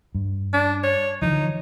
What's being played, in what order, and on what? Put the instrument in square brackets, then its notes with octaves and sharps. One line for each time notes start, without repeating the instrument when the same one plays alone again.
[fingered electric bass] G2
[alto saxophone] D4
C#5
[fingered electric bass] D3 E3 F3 [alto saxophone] D#4